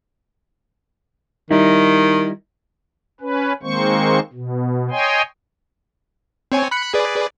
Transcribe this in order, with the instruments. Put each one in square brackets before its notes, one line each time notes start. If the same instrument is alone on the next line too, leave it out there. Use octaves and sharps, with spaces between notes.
[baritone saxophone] D#3 [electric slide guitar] G3 D#4 E4
[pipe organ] C#4 B4
D#3 G#3 A#3 C4 C5 C#6
B2
C#5 D#5 G5 G#5 C6
[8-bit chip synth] C4 C#5 G#5
B5 F#6 C#7
G#4 B4 D5